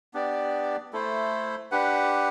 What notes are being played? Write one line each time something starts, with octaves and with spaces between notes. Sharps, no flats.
B3 D4 G4 D5
A3 E4 A4 C5
D4 G4 B4 F#5